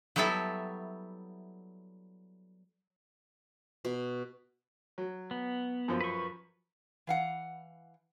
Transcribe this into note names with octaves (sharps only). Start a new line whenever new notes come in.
F#3 G3 B3 E4 A4 E5
B2
F#3
B3
F#2 F3
B4 C#6
E3 F5 F#5